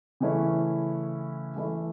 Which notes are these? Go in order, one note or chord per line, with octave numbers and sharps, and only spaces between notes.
C#3 E3 A3 C#4 E4
E3 A3 E4